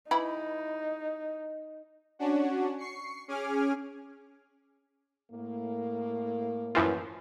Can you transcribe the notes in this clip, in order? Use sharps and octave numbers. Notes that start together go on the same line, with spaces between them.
E3 D#4 E4 B5
C#4 D4 F#4
C#6 C7 C#7
C#4 G#4 G#5 D6 F6
A2 A#3
F#2 E3 F3